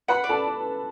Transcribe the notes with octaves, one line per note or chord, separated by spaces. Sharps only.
B4 F#5 B5
D5
A4 A5